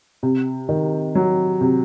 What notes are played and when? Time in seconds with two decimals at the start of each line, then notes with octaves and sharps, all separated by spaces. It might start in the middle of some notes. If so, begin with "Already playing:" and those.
0.23 C3
0.69 D#3
1.15 F#3
1.61 C3